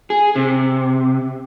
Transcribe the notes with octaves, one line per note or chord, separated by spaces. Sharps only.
G#4
C3